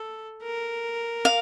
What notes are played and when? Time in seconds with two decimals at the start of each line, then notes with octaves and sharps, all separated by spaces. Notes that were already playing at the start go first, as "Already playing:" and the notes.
Already playing: A4
0.43 A#4
1.25 F5